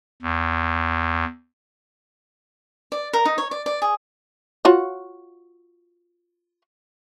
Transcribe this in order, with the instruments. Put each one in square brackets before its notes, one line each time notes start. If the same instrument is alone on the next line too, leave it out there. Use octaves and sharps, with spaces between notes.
[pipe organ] E2
[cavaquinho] D5
A#4
D#4
C#5
D5
D5
G#4
[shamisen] F4 F#4 C#5